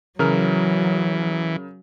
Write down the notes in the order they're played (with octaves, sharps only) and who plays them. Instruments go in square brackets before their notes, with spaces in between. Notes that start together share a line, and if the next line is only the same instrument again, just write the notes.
[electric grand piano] C#3 A#4 F6 [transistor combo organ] E3 [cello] F#3